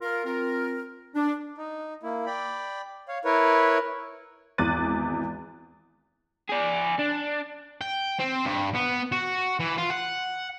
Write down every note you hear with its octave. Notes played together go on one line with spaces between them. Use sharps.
F4 A#4
C4 F4 A#4
D4
D#4
A#3 E4
D5 G5 B5
C#5 F5
E4 A#4 B4 C#5
G#1 E2 D6 F#6 A6 D#7
G#4 D5
D4
G5
C4
G2
B3
F#4
E3
F4
F#5